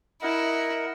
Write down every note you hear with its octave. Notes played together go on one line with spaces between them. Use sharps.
E4 A#4 D#5 F#5